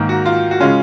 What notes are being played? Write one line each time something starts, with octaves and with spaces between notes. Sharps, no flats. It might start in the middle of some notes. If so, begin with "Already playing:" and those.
Already playing: G#2 D#3 A#3
F#4
F4
F#4
C#3 G#3 C#4 F4